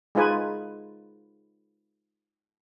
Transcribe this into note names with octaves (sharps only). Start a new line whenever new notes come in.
G#3 D#4 F4 B4 G#5